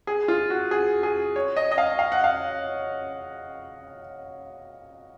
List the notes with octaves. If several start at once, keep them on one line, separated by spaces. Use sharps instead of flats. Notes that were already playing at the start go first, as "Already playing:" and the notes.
G#4
F4
F#4
G#4
G#4
C#5
D#5
D#5
F5
F5
F#5
F5